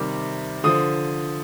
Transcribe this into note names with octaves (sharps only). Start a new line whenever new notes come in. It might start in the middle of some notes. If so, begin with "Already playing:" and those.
Already playing: C3 D#3 G3 D6
D3 F3 D#6